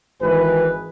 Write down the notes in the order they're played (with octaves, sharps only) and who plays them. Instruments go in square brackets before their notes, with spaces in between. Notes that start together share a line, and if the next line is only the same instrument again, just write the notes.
[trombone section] G#1 E3 G#4 B4